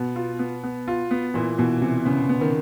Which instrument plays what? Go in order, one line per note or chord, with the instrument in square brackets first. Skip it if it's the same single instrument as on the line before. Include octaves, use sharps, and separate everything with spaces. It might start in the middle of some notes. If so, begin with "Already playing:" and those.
Already playing: [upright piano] B2 [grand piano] B3
[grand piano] F4
B3
B3
F4
B3
[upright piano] A#2 [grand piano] E3
[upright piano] B2 [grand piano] E3
[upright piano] C3 [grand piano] E3
[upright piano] C#3 [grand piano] B3
[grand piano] B3
[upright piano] D#3